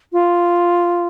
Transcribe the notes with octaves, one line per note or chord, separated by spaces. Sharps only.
F4